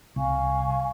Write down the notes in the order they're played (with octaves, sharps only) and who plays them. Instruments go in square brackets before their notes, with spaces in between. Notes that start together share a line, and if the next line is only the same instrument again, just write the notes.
[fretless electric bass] C2 [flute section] F5 G#5 C#6